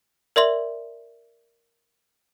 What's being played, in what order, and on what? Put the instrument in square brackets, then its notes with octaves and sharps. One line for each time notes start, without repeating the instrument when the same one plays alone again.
[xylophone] A#4 D5 E5 C6 F#7